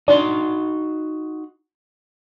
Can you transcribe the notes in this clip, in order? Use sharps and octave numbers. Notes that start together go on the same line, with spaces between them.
D4 D#4 F#4 C6